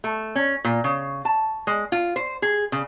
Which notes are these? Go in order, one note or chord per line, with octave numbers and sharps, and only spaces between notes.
A3
C#4
A#2
C#3
A5
G#3
F4
C5
G#4
C#3